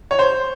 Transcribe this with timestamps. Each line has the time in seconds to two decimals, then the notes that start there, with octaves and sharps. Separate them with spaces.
0.11 C#5
0.19 C5